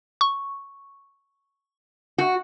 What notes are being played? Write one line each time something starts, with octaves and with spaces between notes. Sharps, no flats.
C#6
F#4